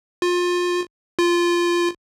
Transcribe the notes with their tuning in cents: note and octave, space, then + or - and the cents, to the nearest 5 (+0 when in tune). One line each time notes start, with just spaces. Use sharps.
F4 +25
F4 -10